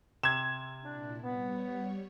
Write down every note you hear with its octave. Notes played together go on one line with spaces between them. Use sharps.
C3 G#6 E7
A#2 D4 E4
G3 B3 C#5